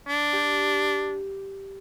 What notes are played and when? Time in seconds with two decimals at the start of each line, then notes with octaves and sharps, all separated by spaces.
0.08 D4
0.33 G4